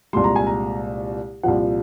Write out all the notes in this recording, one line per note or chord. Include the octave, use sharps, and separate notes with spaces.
C2 A#2 G#3 C6
A#5
G#5
A#5
C2 A#2 F3 F#5